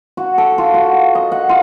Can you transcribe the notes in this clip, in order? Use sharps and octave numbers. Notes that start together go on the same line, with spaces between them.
F#4
A4
F4
F#4
D#5
F#5
F4